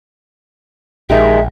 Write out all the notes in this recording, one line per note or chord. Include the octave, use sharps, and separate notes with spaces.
A#1 D#3 G#3 D#4 G4 E5